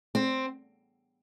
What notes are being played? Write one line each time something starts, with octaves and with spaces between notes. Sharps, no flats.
C4